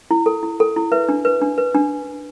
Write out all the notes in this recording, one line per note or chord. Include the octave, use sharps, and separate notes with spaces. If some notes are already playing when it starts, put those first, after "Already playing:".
E4
A4
E4
A4
E4
B4 E5
D4
B4
D4
B4
D4